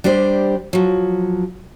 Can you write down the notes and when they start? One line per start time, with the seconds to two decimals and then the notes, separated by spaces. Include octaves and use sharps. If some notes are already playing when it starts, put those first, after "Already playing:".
0.04 G3 D4 G4 C5
0.73 F3 F#3